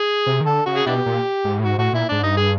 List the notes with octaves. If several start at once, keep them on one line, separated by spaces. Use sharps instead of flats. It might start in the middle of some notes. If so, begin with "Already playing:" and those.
Already playing: G#4
C3
D#3
D3 A4
C#3 F#4
G#4
B2 D4 E4 G4
A#2
G#2
A2
G#2 F#4
A2 F#4
A#2 E4
G#2 D4
G2 D#4
G#4